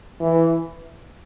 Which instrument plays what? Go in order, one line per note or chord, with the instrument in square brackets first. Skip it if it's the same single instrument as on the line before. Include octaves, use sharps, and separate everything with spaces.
[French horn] E3